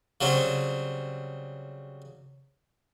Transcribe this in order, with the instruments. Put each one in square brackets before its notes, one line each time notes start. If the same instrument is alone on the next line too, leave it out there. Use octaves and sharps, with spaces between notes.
[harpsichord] C#3 F#3 G3 C4